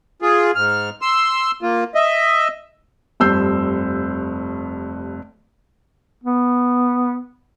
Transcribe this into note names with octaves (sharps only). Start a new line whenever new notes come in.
F4 G#4
G#2 F6
C6 E6
A#3 F4
D#5 E5
F1 G2 C4 E6 G6 C7
B3